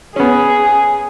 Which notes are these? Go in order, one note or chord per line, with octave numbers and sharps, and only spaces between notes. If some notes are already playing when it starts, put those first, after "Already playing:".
B3 C#4 G#4